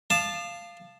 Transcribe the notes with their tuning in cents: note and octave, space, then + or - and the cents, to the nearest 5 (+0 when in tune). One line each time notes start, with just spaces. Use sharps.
F5 -10 A5 +0 D#6 -45